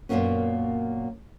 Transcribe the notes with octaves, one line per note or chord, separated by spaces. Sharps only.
F#2 A#2 F3 A#3 B3 C#4